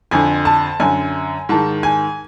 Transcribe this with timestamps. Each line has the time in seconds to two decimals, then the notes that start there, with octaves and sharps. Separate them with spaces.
0.11 F2 D3 G#5
0.45 A5
0.80 F#2 D3 G#5
1.49 G#2 D#3 A5
1.83 G#5